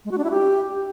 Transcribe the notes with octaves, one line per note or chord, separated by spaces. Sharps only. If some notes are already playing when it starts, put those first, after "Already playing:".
G#3
F#4
D4
E4
G4